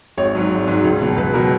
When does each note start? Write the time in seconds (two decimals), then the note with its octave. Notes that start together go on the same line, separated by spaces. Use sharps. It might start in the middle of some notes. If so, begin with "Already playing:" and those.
0.17 G#1 C#5
0.35 G#2 F#3
0.50 G#1
0.67 G#2 F#3
0.84 C#2
1.01 B2 F#3
1.17 C#2 B4
1.34 B2 F#3 A#4